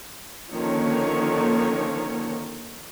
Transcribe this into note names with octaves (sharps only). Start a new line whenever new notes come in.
D3 D#3 F3 A#3 C#4 C#5